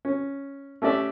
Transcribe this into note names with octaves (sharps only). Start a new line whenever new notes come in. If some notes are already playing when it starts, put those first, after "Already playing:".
C#4
A3 C#4 G4 D5 E5